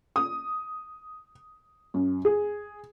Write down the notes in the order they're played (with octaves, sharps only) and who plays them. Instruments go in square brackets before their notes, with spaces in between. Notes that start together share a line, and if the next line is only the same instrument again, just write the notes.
[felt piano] D#6
F#2
G#4